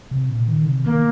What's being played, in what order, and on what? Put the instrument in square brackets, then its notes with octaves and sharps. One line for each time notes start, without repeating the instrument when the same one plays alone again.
[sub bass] C3
A#2
D#3
C3
[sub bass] D#3 [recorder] A#3